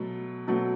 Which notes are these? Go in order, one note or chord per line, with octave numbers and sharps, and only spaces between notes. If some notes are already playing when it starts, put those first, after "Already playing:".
Already playing: B2 F#3 A3
B2 F#3 A3